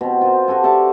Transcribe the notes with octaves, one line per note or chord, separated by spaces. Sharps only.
B2 C4
F4 A#4 C5
F#4 G4 A4 G#5
A4 D5 E5 A5